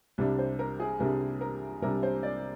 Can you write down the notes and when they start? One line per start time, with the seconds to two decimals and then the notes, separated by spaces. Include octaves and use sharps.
0.18 C2 C3 G3 D4
0.39 C5
0.59 A#4
0.80 G#4
1.00 C2 C3 G3 D4 A#4
1.41 A#4
1.82 C2 C3 G3 D4 A#4
2.03 C5
2.23 D5